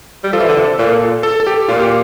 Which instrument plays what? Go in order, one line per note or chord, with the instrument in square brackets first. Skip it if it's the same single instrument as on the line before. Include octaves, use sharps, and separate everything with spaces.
[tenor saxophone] G3
[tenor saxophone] F3 [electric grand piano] A4
[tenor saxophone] E3
D3
C3
A#2
[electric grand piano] A4
A4
G4
[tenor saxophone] A#2 [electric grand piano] F4
[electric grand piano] G4